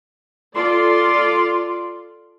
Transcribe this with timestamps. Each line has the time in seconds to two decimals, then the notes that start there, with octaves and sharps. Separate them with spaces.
0.55 F4 A4 D5 C6